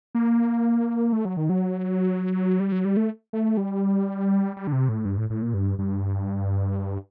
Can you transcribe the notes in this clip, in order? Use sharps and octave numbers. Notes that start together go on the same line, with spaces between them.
A#3
A3
F#3
D#3
F#3
G3
F#3
G3
A3
A3
G3
G3
D3
C3
A2
G2
A2
A2
A#2
G2
G2